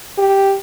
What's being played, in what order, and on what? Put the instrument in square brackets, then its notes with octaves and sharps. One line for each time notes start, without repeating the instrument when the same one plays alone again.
[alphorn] G4